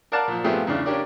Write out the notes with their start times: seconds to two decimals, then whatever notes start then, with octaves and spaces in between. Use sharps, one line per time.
0.12 A#4 D5 F5 F#5 A5
0.28 A#2 F3
0.44 F3 A3 B3 C4 G4 G#4
0.67 E2 C#3 D4 F5
0.86 C#4 D4 G4 A#4 D5